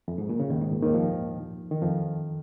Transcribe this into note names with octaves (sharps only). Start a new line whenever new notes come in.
F2
G#2
A#2
C#3
D#2 D#3
G#2
A#2
D#2 D#3
F2 F3
D#3
F2 F3